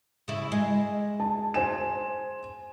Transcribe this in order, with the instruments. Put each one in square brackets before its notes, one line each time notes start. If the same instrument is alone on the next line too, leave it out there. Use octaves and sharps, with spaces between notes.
[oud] C#3 E4
G#3
[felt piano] A5
C5 G#5 E7